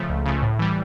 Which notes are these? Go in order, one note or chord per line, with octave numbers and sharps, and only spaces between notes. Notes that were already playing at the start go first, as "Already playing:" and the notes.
Already playing: C#3 F3 A3
C#2
C#3 F3 A3
A2
E3 G3